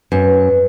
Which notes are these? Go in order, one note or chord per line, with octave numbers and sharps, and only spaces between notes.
F#2 B4